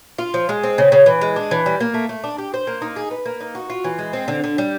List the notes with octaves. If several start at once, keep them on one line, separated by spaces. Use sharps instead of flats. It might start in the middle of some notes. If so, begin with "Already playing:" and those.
F4
F3
G#3
C4
C#3
C#3
E3
G#3
D4
E3
G3
A#3
A3
A3
D4
G4
C5
A#3
D#4
G#4
B4
A#3
D#4
F#4
F4
E3
G#3
C4
D3
D3
G3